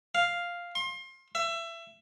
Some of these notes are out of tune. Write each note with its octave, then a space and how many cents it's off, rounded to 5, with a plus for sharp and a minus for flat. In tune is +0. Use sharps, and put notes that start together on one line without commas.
F5 +0
C6 +30
E5 +25